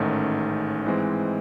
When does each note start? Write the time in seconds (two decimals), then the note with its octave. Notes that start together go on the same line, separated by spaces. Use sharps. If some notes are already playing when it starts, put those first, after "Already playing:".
Already playing: A1 G#2 D#3 A3 C#4
0.85 G#2 E3 G#3 C4